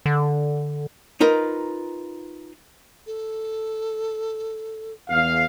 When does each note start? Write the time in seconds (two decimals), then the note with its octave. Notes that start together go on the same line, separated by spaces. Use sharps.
0.06 D3
1.21 D#4 F4 A#4 B4
3.07 A4
5.09 E2 F5